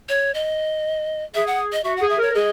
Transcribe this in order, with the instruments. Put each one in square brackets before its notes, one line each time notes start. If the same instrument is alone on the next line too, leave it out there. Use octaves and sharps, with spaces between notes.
[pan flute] C#5
D#5
[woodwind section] G#4 [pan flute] E5
[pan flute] F#5
D#5
[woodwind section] F#4 [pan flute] E5
[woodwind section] G#4 [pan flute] F#5
[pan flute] E5
[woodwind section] A#4
[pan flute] C#5
[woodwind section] A#4
[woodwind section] G#4 [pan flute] D#5